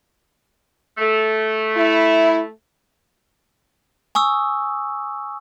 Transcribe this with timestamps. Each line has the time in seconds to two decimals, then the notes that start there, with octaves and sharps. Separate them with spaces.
0.98 A3
1.75 E4
4.15 G#5 C#6 D#6 E6